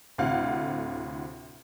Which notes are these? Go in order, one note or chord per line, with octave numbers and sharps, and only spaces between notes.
D2 A2 C3 F5 F#5